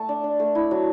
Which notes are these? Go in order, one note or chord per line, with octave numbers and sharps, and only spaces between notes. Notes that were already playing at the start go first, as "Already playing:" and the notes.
Already playing: A3 A5
D4
D4
A3
E4
F#3